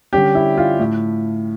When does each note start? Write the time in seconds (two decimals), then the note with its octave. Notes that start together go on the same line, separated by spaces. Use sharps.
0.13 D3 G3 C#4 G4
0.35 E4
0.58 F4
0.79 A2